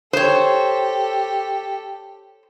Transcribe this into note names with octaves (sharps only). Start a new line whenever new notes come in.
G4 A4 C5 C#5